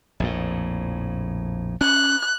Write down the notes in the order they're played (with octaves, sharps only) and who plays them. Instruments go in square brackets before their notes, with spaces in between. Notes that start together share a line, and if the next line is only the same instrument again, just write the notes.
[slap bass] A#1 F2 A2
[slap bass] C#4 [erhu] F#6